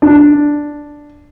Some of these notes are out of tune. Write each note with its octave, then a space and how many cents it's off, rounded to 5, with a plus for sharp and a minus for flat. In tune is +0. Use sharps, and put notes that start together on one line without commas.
D4 +0